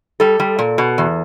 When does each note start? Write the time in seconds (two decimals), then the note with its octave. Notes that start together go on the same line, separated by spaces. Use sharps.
0.20 G3 A4
0.40 G3
0.59 A#2
0.78 B2
0.98 E2